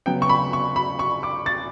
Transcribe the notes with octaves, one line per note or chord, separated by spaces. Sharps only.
C#3 F#3 B3 G5
C#6
B5
C#6
B5
C#6
D6
A6